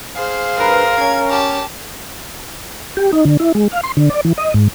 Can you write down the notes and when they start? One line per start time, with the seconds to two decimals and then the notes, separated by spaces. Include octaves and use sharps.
0.16 G#4 C5 F5
0.58 G2 A#4 B4
0.99 C#4 G#6
1.30 G4 A5
2.97 G4
3.13 D#4
3.25 D3
3.40 E4
3.55 G#3
3.72 F5
3.83 C6
3.97 D3
4.10 D5
4.25 E3
4.38 D#5
4.54 G#2